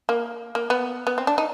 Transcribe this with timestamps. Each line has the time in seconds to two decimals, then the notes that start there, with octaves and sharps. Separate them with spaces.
0.09 A#3
0.55 A#3
0.70 B3
1.07 B3
1.18 C4
1.27 D4
1.38 D#4